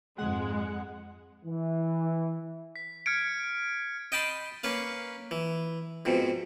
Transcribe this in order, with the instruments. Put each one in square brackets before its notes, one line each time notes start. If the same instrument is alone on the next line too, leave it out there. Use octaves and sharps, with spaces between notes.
[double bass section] F2 G#2 [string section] G#3 [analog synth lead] F#5
[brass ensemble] E3
[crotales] B6
F6 G#6 C#7 D7
[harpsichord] D#5 G5 A5 B5 C6
A#3 C#4 B4 F5
E3
F2 G#2 B2